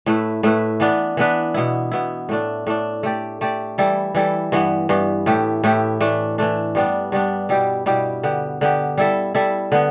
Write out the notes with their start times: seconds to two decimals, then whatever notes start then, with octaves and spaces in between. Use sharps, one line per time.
0.06 A2 A3 E4 B4
0.43 A2 A3 E4 B4
0.80 E3 B3 D4 B4
1.17 E3 B3 D4 B4
1.54 B2 B3 E4
1.91 B2 B3 E4
2.29 A2 A3 D4
2.67 A2 A3 D4
3.03 A3 G4 D5
3.41 A3 G4 D5
3.78 E3 G3 E4 A4
4.15 E3 G3 E4 A4
4.52 G2 E3 B3
4.89 G2 E3 B3
5.26 A2 A3 E4 G4
5.64 A2 A3 E4 G4
6.01 E3 A3 D4
6.38 E3 A3 D4
6.75 G2 G3 B3 D4
7.12 G2 G3 B3 D4
7.49 B2 G3 E4 G4
7.86 B2 G3 E4 G4
8.23 D3 B3 G4
8.61 D3 B3 G4
8.98 G3 E4 A4 E5
9.35 G3 E4 A4 E5
9.72 D3 B3